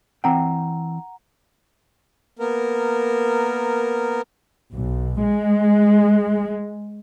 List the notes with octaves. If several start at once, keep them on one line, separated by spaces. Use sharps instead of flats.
E3 C4 F#5 G5 A#5
A#3 B3 A#4
B1
G#3